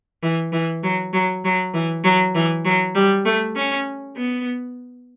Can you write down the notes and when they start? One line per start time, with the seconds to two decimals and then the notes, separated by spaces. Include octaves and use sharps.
0.23 E3
0.53 E3
0.83 F#3
1.13 F#3
1.44 F#3
1.74 E3
2.04 F#3
2.35 E3
2.65 F#3
2.95 G3
3.25 A3
3.56 C#4
4.16 B3